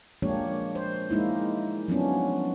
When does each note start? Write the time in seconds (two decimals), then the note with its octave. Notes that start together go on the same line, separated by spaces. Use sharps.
0.22 F3 G#3 A#3 D4 G4 C#5
0.75 C5
1.10 G#3 A#3 D#4 E4
1.88 F3 F#3 B3 C#4 D4